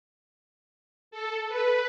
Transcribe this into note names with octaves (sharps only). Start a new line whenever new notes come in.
A4
B4